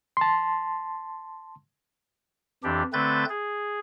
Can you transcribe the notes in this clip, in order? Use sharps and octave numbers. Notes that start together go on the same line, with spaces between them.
A5 C6
F2 E3 D4 G4
D3 A3 C4 B4 G6 A6
G#4